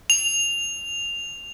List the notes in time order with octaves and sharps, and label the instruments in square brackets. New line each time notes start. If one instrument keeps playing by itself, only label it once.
[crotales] F7